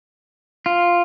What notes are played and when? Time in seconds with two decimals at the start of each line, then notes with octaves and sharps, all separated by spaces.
0.66 F4